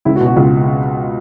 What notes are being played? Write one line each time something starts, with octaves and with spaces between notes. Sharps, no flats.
C#2 E4
F#4
B2
F#4
C#2 F4